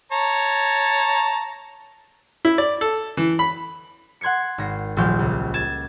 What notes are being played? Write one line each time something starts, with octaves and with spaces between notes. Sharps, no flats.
C#5 A5 A#5
E4
D5
A4
E3
B5
F#5 C6 G#6 C7 C#7
G#1 A#6 C7
D#1 A#1 F#3 G3 C6 G6
C#2
G#6 A6 E7